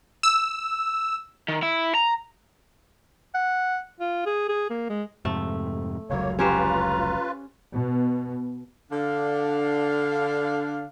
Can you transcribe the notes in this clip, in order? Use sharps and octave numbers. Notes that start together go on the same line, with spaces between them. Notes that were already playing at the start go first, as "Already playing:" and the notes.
E6
D#3
E4
A#5
F#5
F4
G#4
G#4
A#3
G#3
F2 G#2 C3 A3
F1 C#2 F#3 A#3 C#5 F5
C#4 F4 G4 B4 C5 A#5
B2
D3 D4 F5